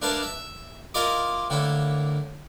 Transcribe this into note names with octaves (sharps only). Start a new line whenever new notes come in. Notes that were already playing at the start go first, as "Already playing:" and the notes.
D4 E4 A#4 B4 F5 A5
E5
E4 F4 A#4 D5 D#5 D6
A2 D3 A#3 E4